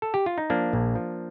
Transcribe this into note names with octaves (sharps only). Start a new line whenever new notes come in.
A4
G4
F4
D#4
F3 A#3 D4
A#1
F3